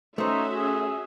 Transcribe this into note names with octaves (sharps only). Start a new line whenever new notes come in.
A3 C#4 D#4 F#4 C5 E5
G#4